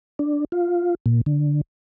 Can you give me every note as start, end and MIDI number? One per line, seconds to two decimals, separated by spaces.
0.19 0.45 62
0.52 0.95 65
1.06 1.21 46
1.26 1.61 50